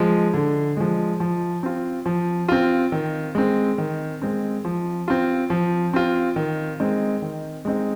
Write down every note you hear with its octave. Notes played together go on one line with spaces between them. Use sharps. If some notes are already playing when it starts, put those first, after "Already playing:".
Already playing: F3 G#3
D3
F3 G#3
F3
C4 F4
F3
C4 F4
D#3
G#3 C4
D#3
G#3 C4
F3
C4 F4
F3
C4 F4
D#3
G#3 C4 D#4
D#3
G#3 C4 D#4